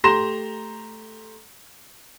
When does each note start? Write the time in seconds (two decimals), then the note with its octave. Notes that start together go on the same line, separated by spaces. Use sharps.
0.04 A3 G4 A#5 C6 A#6 E7